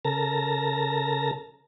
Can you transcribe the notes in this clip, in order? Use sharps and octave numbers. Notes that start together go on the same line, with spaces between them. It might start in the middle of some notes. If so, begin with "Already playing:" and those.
C#3 A4 A#4 A5 A#5 A#6